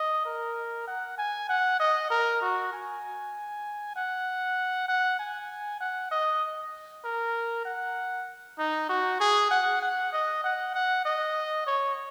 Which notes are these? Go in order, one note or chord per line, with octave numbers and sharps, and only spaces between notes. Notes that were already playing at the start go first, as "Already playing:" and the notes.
Already playing: D#5
A#4
F#5
G#5
F#5
D#5
A#4
F#4
G#5
F#5
F#5
G#5
F#5
D#5
A#4
F#5
D#4
F#4
G#4
F#5
F#5
D#5
F#5
F#5
D#5
C#5